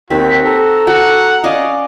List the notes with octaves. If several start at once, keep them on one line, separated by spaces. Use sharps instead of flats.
D#2 C4 F#4 B6
A4 A#5
F#4 F#5
C#4 D5 D#5 F5